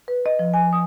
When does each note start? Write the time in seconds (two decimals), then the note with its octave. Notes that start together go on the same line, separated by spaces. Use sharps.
0.08 B4
0.26 D#5
0.39 F3
0.54 G#5
0.73 D#6